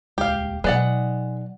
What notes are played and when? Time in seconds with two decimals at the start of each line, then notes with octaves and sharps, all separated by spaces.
0.18 D#1 C#2 G#3 G4 F5
0.64 B2 F#3 G#3 D#4 B4 D5 F#5